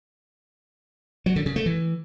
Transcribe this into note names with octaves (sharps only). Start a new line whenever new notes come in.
F#3
D3
C#3
A3
E3